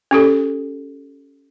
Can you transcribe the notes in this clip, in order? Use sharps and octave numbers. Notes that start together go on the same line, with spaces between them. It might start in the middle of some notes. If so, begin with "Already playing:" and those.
C#4 G4 A4